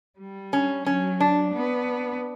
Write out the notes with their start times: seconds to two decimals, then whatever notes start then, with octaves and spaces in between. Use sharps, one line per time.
0.19 G3
0.53 C#4
0.86 F#3 C#4
1.20 D4
1.54 B3